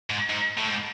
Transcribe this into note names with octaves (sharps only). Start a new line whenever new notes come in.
G#2
G#2
A2
G#2